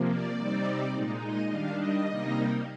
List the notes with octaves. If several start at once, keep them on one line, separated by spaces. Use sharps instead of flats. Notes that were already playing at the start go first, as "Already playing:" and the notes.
Already playing: C3 F3 A#3
D5
C3 G3 C4 D#4
A#2 G#3 D#4
D#5
D#3 G3 D4 F5
D#5
C3 G3 A#3 D#4